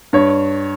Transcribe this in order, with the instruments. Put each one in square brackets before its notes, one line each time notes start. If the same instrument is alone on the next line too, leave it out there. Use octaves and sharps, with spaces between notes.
[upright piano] G2 C#5